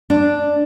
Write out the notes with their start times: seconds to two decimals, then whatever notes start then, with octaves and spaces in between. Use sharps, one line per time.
0.10 D4